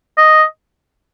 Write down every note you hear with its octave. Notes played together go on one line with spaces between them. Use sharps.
D#5